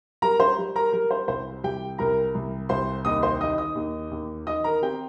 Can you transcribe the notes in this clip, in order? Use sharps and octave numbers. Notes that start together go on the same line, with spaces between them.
G3 A#4 A#5
C5 C6
G3
A#4 A#5
G3 A#4
C5
C2 C5
C2 G4 G5
C2 A#4 A#5
C2
C2 C5 C6
D#2 D#5 D#6
C5 C6
D#3 D#5 D#6
D#5 D#6
D#2
D#2
D#3 D#5 D#6
A#4 A#5
C4 G4 G5